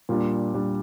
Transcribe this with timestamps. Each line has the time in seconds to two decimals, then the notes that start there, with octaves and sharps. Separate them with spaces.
0.09 A#2 G3 D4
0.54 A#2 G3 D4